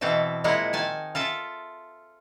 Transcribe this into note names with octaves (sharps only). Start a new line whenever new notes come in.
B2 E3 C4 A4 E5
A#2 F3 G#3 A#3 E4 F#5
D#3 G#5 A5
F4 A4 E5 A5